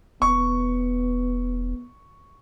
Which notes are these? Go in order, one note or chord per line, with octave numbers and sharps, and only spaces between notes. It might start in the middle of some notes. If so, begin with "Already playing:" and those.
E1 B3 C#6